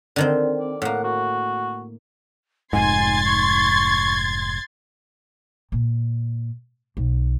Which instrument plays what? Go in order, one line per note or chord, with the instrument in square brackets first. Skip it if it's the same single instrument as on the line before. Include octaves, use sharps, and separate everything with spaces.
[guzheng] D3 D#3 C4
[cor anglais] D5
[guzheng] A2 A#3 [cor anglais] F#5
[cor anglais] F#4
[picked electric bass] F1 G#2 [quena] G#5 [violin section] C6 G#6 A6
[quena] C#6
[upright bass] A#2
B1